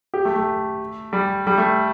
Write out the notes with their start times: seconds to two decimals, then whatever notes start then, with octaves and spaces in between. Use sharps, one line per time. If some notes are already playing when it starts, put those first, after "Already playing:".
0.14 G4
0.25 A3
0.36 A3
1.13 G3
1.47 G3
1.58 A3